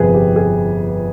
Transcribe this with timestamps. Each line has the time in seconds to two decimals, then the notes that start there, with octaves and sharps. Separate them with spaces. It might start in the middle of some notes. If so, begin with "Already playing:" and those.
Already playing: G1 F2 C3 F3 C4 G#4 B4
0.15 G4
0.36 G#4